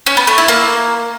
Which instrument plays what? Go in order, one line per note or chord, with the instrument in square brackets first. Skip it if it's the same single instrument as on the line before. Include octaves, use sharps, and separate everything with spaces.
[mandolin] C#4
B3
A3
E4
A#3